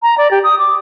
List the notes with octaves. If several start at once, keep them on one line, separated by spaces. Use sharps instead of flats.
A#5
D5
G4
D#6
D6